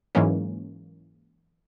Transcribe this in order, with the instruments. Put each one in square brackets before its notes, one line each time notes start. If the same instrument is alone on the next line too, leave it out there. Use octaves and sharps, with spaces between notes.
[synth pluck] G#2 E3 F#3 G#3 A#3 C#4